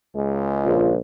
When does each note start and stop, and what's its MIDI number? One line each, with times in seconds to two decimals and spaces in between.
0.15 0.96 37
0.15 0.77 56
0.65 0.97 34
0.65 0.93 65